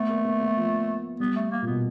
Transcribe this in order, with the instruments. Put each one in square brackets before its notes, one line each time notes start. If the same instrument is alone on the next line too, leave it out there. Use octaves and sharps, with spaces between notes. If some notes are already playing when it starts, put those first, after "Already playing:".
Already playing: [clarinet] A3 [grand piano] B3
[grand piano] A#3
B3
B3
F3
[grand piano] G3 [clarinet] B3
[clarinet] A3
A#3
[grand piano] A#2
[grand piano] B2 [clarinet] B3